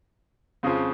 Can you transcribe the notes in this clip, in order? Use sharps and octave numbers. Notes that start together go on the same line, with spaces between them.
F2 C#3 F3